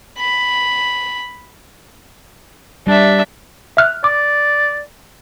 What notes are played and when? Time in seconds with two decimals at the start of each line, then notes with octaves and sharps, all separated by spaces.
0.19 B5
2.87 G3 D4 E5
3.77 E5 F6 F#6
4.04 D5 D6